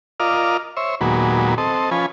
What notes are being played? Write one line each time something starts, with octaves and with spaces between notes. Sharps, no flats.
F4 A#4 D5 D#5 F6
C5 C#5 E5
D#2 A#2 F#3 G#3 B3
C4 A4 D#5
F3 C#4 B4 G#5